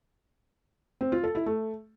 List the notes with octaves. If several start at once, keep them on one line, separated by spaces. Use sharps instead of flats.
C4
F4
A4
E4
A3